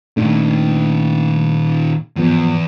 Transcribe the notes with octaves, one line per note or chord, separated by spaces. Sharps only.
A#2 D#3 A3 D4
E2 G#2 F3 B3